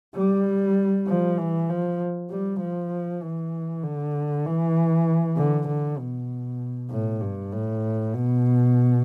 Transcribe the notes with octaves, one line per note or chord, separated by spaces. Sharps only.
G3
F3
E3
F3
G3
F3
E3
D3
E3
D3
D3
B2
A2
G2
A2
B2